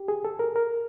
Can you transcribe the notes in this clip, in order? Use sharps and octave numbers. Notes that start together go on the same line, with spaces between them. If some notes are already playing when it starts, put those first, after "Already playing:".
Already playing: G4
G#4
A4
A#4
A#4